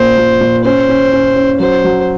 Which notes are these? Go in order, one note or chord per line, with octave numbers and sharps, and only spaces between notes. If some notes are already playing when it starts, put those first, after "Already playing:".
Already playing: A#2 A#3 C#4 C5
A#2
A#2
C#4 C5
C#4
C#4
C#4
F#3 C5
F#3